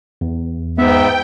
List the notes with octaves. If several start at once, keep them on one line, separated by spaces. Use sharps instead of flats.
E2
G#2 B3 E5 G5